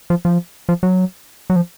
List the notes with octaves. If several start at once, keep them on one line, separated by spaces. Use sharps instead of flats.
F3
F3
F3
F#3
F#3
F3